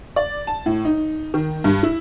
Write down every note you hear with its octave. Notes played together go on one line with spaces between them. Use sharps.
D5
A5
A2
D#4
D#3
G2
E4